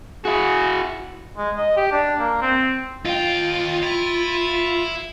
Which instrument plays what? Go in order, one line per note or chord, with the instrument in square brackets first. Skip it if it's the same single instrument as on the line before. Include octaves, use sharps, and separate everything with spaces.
[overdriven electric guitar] E4 F#4 [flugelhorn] G#4
[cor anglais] G#3
D#5
G4
D4
A#3
C4
[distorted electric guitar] D#2 G5 [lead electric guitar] F4
[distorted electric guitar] E4